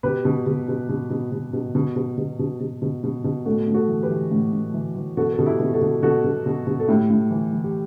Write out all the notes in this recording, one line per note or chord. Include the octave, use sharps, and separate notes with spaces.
B2 G4 B4
B2
B2
B2
B2
B2
B2
B2
B2
B2
B2
B2
B2
B2
B2
B2
A2 F#4 A4
A2
F#4 A4
E3
G4 B4
E3
A2
A2
E3
E3
B2 F#4 A4
B2 A4
E4 G4
B2
F#4 A4
B2
B2 F#4 A4
B2
B2
B2
A4
A2 E4 G4
A2
E3
E3
G4